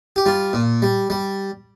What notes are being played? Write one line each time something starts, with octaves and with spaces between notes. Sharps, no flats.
G4
G3 F4
A#2
G3
G3